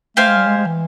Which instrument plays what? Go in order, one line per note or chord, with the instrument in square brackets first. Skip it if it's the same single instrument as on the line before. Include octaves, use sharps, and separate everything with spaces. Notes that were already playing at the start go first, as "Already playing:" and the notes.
[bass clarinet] A3 [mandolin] G4 C5 F5 G#5
[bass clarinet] G#3
G3
G#3
G#3
E3